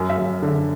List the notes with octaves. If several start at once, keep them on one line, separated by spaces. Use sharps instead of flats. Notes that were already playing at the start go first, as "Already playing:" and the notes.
Already playing: F#2
E5
F#2
D3